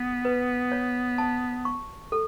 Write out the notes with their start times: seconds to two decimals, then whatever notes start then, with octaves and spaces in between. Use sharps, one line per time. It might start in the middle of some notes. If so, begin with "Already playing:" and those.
Already playing: B3
0.25 B4
0.72 C#5
1.18 A5
1.65 C#6
2.12 A4